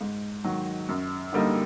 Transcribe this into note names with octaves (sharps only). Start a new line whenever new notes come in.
G#2
D#3 F#3
F#2
D3 G3 A#3 D#4